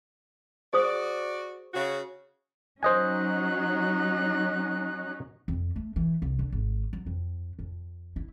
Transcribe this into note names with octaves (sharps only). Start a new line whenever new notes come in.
F#4 G#4 C5 D5 D#6
C#3 F#4
F#3 C#4 D#4 C5 D#5 G#5 F#6
F2
A3
E3
C2
D3
G#1
F#3
F2
F2
E4